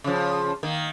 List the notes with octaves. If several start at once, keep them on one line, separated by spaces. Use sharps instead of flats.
C#3 F3
D#3 A#3